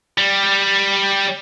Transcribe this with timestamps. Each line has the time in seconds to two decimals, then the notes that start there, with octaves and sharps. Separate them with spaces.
0.18 G3